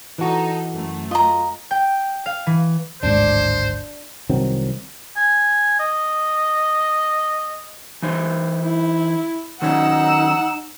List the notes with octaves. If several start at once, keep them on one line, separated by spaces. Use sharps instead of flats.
E3 D#4 F#4 A4
F#2 A3
F4 D#5 A#5
G5
F5
E3
D1 G#1 G#2 D4 C5
C2 D#3 F#3 C4
G#5
D#5
E3 D#4 C5
E4
D#3 F#3 C#4 D#4 F#5 E6